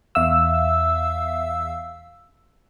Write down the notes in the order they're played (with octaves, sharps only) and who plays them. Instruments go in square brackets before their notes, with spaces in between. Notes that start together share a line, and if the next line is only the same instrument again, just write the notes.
[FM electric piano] E2 E5 F5 E6